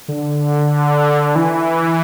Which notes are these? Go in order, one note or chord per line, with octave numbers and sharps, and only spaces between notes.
D3
E3